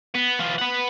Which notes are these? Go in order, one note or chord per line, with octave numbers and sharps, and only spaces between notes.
B3
E3 F4
B4 F#5